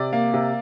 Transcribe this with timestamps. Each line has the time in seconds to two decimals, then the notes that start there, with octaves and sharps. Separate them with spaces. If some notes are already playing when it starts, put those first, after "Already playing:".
Already playing: C3 D5
0.13 A#3
0.34 C3